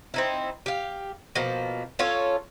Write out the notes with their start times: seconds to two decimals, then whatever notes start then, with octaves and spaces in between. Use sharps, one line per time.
0.14 C4 D#4 E4
0.66 G4 F5
1.35 B2 F3 A#3
1.99 C#4 F4 A4 C#5